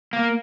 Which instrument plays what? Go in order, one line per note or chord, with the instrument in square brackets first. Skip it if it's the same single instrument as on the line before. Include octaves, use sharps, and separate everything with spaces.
[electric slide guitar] A#3